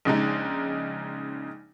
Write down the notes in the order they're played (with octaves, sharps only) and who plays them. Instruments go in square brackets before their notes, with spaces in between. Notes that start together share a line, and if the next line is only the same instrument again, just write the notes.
[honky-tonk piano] A#1 C#3 G#3 D#4